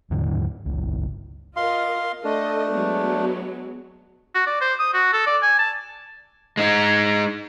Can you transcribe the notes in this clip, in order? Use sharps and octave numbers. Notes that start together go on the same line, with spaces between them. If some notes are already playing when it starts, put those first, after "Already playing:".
D#2 G#2 D3 F#3
G1 C#2
F4 A#4 D#5 F5 C6
A3 D4 A4 D#5
F#3 G#3 B3
F#4
D5
C5
D#6
F#4
A4
D5
G#5
A5
G#3 D#4